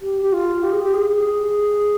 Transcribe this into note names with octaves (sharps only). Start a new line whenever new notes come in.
G4
G4
F4
G4
G#4
G4
G#4